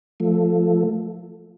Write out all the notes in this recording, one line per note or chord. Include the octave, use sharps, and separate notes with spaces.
F3 A3